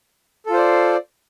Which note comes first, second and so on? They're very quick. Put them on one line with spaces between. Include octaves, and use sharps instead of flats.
A4 F4 C5 D5